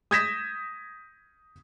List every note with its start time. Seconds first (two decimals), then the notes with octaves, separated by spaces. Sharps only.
0.11 D#6 G6 G#6 A#6 B6 E7